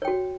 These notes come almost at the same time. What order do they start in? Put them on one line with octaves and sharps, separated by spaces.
C#5 G5 F#4